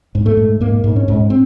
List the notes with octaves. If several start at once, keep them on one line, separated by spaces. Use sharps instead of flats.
G#2
A3
G#2
G#2 A#3
G#2
C#4
G#2
C4